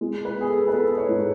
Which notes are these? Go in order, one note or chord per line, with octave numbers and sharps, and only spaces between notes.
G#3
B4
B3 G#4
A4
B4
B3 A4
C#5
G#2